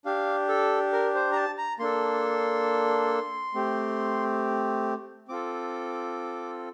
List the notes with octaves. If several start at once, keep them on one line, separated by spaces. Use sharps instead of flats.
D4 G4 F5
A4
A#4
C5
A#5
A5
A#5
A#3 D4 A4 C6
A3 C4 G4
C4 F4 A4 D6